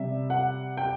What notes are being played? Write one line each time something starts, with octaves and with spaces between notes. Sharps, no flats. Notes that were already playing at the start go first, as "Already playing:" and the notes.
Already playing: C3 G3 E5
F#5
G5